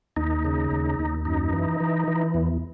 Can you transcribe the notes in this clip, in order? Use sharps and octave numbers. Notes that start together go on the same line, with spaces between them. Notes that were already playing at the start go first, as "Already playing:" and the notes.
D#2 D#4
C#3
D#2
D#2
F#2 D#4
E3
E3
E3
E2